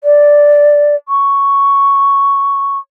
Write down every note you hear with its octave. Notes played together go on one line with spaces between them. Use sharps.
D5
C#6